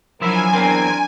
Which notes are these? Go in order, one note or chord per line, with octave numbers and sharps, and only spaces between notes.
F3 F#3 D4 E4 A#4 E5 G#5
E2 C4 D4 A#4